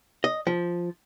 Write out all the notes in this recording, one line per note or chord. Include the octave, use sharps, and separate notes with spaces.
D#5
F3